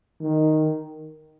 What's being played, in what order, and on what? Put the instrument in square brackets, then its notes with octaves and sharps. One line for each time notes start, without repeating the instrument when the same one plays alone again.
[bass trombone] D#3